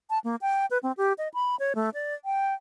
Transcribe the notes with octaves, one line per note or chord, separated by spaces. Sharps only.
A5
A#3
G5
B4
C4
G4
D#5
B5
C#5
A3
D5
G5